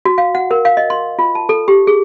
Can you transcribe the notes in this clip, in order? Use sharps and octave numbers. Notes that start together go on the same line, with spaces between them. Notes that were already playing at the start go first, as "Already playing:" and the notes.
F#4
F5
F#5
A#4
F5
D#5
C6
F4
A5
A4
G4
G#4